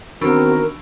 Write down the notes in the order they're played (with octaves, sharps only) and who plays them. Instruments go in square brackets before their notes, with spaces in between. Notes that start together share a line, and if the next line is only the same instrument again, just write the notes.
[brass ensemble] D#3 B3 C4 [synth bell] E3 D4 C#6 [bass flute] F#4 [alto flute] A#4